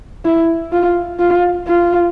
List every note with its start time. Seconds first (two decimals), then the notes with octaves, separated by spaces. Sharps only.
0.25 E4
0.72 F4
1.19 F4
1.67 F4